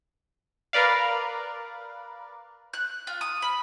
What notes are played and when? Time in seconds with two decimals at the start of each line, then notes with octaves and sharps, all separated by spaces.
0.73 A#4 B4 D5 F5
2.74 F#6
3.07 F4
3.21 D#6
3.42 B5